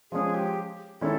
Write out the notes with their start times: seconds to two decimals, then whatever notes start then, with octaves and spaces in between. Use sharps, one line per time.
0.12 F3 G#3 C#4 G#4
0.34 G4
1.01 D#3 G#3 C#4 E4 A4